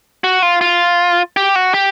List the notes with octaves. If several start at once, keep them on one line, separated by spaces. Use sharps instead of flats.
F#4
F4
F4
G4
F#4
G4